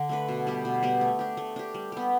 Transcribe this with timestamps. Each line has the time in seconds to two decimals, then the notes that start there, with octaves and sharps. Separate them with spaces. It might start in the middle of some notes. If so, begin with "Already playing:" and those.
Already playing: D3
0.09 A3 D4 B4
0.28 B2
0.47 G3 B3 G4
0.65 B2
0.83 G3 B3 G4
1.01 A3
1.19 D4 G4
1.37 A3
1.56 D4 G4
1.74 G3
1.92 B3 G4